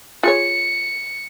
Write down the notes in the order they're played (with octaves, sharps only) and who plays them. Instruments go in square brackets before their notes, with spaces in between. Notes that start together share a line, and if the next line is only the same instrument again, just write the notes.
[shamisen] F4 G#4 C#5 [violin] C#7